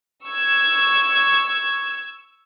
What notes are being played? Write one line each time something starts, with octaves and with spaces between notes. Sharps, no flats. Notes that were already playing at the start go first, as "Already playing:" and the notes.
C#6 E6 G#6